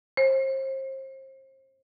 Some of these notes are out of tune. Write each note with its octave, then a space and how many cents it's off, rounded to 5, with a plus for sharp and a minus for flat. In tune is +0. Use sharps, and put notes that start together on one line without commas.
C5 +35